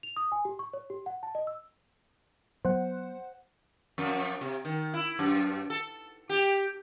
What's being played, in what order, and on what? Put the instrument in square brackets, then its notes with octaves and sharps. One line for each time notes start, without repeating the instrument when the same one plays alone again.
[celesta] F7
D#6
G#5
G4
C#6
C#5
G4
F#5
A5
D#5
E6
[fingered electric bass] F#3 B3 [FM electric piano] C5 F#5
[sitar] F2
C3
D#3
E4
F#2
A4
G4